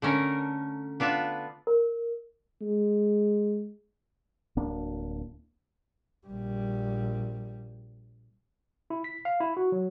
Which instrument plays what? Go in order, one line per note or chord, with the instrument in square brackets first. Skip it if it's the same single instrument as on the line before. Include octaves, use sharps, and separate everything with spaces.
[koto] D3 A3 C#4 A#4
B3 D4 F4 E5
[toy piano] A#4
[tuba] G#3
[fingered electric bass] D1 A#3 D4
[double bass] A#1 G3
[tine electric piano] E4
B6
F5
E4
F#4
F#3